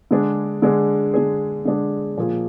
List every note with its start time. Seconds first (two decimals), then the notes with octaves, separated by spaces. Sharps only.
0.11 D3 G#3 D4 G#4
0.62 D3 G#3 D4 G#4
1.14 D3 G#3 D4 G#4
1.65 D3 G#3 D4 G#4
2.17 A#2 F3 A#3 F4 G#4